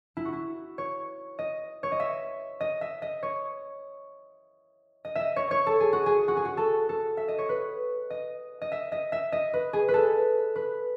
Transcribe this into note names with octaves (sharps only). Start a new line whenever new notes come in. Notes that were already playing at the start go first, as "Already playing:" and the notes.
E4
F#4
E4
C#5
D#5
C#5
D#5
E5
D#5
E5
D#5
C#5
D#5
E5
D#5
C#5
C#5
A4
G#4
F#4
G#4
F#4
G#4
F#4
A4
A4
E5
D#5
C#5
B4
D#5
D#5
E5
D#5
E5
D#5
B4
G#4
B4
A4
B4